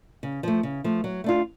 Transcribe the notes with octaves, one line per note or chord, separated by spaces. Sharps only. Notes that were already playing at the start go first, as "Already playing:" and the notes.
C#3
F3 A3
C#3
F3 A3
F#3
A3 D4 F4